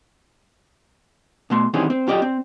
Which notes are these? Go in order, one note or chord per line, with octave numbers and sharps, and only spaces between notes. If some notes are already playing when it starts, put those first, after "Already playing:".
B2 A3 C6
D#3 E3 G3 C4 C#4 G#4
C4
F#2 F4 G4 D5 D#5
C4